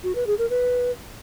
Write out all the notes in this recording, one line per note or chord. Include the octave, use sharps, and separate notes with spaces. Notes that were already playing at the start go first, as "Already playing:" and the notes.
F#4
B4
G#4
A#4
B4